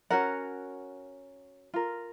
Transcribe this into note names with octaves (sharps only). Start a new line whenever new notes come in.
C#4 F#4 A#4 F#5
F4 A#4